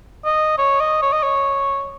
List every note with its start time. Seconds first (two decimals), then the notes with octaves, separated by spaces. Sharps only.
0.25 D#5
0.58 C#5
0.80 D#5
1.02 C#5
1.13 D#5
1.23 C#5